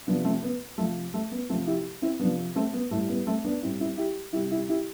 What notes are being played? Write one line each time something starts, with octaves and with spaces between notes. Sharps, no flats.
C3 F3 B3 D4
A3 C4
B3
C3 F3 A3
A3
B3
C3 F3 A3 C4
E4 G4
C4 E4
C3 F3 B3 D4
A3 C4
B3
A2 G3 A3
B3
A3 C4
B3 D4
A2 G3 C4 E4
C4 E4
E4 G4
C3 G3 E4 G4
E4 G4
E4 G4